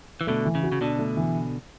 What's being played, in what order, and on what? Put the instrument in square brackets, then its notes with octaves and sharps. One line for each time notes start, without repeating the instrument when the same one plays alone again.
[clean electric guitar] E3
[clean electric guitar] B2 D3 [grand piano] A3
[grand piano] E3
[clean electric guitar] C#3
[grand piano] F#4
[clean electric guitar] C#3
[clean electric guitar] B2 D3 [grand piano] D4
[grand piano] A3
E3